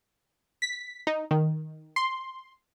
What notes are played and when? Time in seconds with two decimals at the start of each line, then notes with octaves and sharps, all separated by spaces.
0.62 B6
1.07 D#4
1.31 D#3
1.96 C6